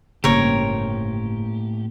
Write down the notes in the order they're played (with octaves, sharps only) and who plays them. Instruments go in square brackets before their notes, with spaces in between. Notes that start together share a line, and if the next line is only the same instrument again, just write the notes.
[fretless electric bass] G1 C#3 [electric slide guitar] A2 G4 [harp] A#3 C4 [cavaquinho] A#4 C#5